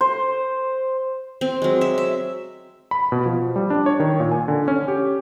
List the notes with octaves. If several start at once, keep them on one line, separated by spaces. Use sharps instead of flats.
C5
C4
F#3 G#3
E5
E5
B5
B2
F3
G3
D4
C#5
D#3
A#2
G#5
D3
C#4
G4